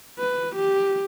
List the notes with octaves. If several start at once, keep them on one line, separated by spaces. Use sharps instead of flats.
B4
G4